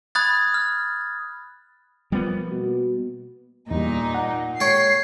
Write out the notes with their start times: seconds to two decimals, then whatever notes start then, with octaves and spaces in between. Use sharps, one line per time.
0.15 B5 D#6 F#6 G#6 A6
0.54 F6
2.12 F3 G3 A#3 B3
2.50 B2
3.71 E2 A#2 G3 D#4
4.15 F#5
4.60 G#3 C#5 G5 C7